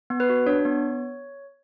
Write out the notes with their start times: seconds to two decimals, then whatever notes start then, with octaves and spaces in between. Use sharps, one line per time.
0.10 B3
0.20 B4
0.29 F#4
0.46 D4 C#5
0.65 B3